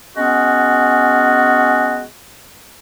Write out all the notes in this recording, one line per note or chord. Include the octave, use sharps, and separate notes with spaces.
G#3 B3 C#4 F#4